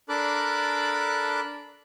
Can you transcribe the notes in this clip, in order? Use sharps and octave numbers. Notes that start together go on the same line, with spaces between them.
D4 A4 A#4 B5 D6 F#6